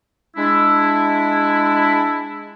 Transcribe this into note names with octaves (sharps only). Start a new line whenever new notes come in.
G#3 D4 E4